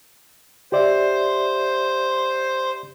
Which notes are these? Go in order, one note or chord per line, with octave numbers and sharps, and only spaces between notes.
G4 C5 D5 E5